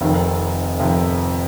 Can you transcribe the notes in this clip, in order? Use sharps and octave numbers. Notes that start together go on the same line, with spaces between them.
F1 F2 C3 D#3
F1 F2 C3 D#3